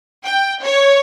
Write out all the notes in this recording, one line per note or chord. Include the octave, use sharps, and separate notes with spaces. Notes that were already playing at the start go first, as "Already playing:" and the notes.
G5
C#5